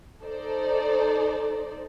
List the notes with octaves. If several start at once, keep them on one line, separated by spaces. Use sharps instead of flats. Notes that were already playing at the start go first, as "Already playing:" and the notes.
D#4 A4 C5 D5